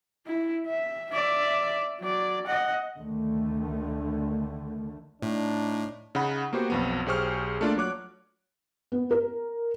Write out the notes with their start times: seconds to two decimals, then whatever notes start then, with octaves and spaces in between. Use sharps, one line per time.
0.27 E4
0.67 E5
1.12 D5 E5
2.00 F#3 D5
2.47 D#5 F#5
2.96 D2 D3 D#3 A3
5.22 A2 D4 D#4
6.15 C#3 D#4 F#5 B5
6.53 A#3 B3 F#4 G4 C5
6.70 B1 F2 B3
7.06 B1 G4 G#4 C5 C#6 F6
7.61 A3 A#3 D4 F4 D5
7.77 F#3 C#5 D6 F#6
8.92 B3
9.11 A#4